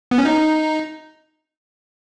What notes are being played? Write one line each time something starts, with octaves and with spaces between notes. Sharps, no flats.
B3
C#4
D#4